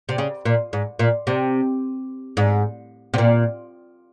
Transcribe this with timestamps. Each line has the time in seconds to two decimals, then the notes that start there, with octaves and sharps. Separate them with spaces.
0.09 C3
0.18 C#3
0.45 A#2
0.73 G#2
0.99 A#2
1.27 C3
2.37 G#2
3.14 C3
3.18 A#2